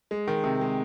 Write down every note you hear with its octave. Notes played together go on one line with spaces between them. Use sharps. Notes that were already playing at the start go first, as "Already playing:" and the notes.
G#3
D#3
C3
G#3